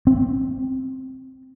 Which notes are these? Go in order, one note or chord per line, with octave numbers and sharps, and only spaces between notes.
C4